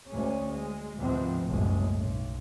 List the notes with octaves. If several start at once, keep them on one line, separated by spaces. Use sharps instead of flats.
D2 G#3 C#4
G#3
D2 G#2 C3 F3 B3 C4
F#1 C2 F#2 A2 G#3
B1